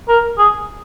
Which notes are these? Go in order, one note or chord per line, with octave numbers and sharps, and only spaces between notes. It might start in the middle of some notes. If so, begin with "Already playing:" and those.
A#4
G#4